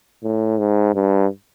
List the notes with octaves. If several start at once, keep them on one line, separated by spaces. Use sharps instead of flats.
A2
G#2
G2